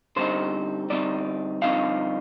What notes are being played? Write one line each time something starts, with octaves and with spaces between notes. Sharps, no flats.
D3 G3 C4 D#4 C5
D3 G3 C4 D#4 D5
G2 D3 F3 C4 D#4 F5